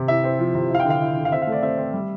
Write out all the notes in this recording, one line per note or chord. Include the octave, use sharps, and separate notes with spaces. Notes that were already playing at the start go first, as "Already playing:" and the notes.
Already playing: C3
E4 E5
C4
F3
C3
E4 F5
G5
D3
F5
E4
D3
F5
C4 E5
F5
A3
D5
C4 E5
C4
G3